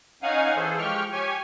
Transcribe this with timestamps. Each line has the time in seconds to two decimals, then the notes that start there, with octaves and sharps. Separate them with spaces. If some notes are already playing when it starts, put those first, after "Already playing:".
0.23 C#4 D#4 F5 F#5 G#5
0.56 E3 G#4 A4 C5
0.78 F3 G#3 G4 G5 C#6 F6
1.12 G4 C#5 G#5